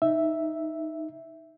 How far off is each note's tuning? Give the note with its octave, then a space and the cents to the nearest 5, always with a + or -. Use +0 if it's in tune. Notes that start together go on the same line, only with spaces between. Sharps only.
D#4 +0 E5 +0